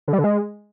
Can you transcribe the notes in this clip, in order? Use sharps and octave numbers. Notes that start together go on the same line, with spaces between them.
D3
G3
D3
G#3